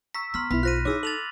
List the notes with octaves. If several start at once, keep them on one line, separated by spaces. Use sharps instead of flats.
A#5 C#6 E6 B6
B3 C6 F6 B6
B1 B3 E4 B5 B6
F4 C5 C6 F#6 A#6 D#7
D#4 E4 G#4 C#5 D6 E6
A4 A6 F7 F#7